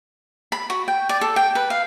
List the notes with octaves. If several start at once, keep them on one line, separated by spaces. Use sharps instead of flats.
B5
F#4
G5
D5
A4
G5
B4
F5